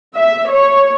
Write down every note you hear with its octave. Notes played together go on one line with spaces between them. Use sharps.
E5
C#5